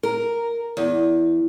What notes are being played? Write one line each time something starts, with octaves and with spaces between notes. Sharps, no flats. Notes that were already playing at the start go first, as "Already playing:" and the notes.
A#4
E2